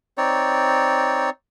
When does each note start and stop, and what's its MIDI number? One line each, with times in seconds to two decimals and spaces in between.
0.18 1.30 60
0.18 1.30 63
0.18 1.30 73
0.18 1.30 74